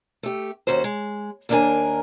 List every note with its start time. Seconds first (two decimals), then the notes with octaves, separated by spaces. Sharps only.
0.23 A3 G4
0.67 D#2 C#4 F#4 C5
0.84 G#3
1.49 D#2 A#3 D4 E4 A#4 G#5